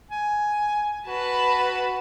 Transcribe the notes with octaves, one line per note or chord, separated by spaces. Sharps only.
G#5
F#4 B4 A5 B5